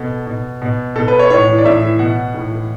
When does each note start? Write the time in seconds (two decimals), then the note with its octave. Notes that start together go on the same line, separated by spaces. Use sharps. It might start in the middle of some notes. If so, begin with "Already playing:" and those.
Already playing: B2 A4
0.27 B2
0.62 B2
0.96 B2 A4
1.08 B4
1.19 C#5
1.30 A2 C#5
1.48 E3
1.58 D5
1.65 A2 E5
1.82 E3
1.99 B2 F#5
2.34 A2
2.51 E3